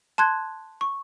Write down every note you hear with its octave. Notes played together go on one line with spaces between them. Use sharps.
A5 C6 F#6 G#6
C#6